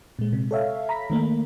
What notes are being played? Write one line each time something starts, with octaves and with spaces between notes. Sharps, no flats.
A#2 G#3
C3
A4 C#5 E5 F5
A#5 B5 B6
D#3 A3 A#3